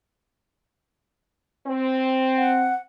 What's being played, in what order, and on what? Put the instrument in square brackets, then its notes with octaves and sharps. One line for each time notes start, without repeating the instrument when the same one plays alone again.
[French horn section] C4
[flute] F#5